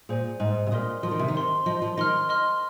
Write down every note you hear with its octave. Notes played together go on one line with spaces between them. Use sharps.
A#2 G#4 C5 G#5
G#2 G#4 C5 G#5
C3
A#2 A#4 D#5 C6 D#6
F3 A#4 D#5 C6 D#6
D#3
C3
D#3
C5 D#5 C6
F3 C5 D#5 C6
F3
D#3 D#5 C6 F6
D#5 C6 F6